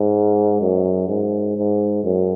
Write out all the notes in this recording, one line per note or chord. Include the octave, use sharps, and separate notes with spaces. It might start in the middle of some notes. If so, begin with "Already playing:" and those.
Already playing: G#2
F#2
G#2
G#2
F#2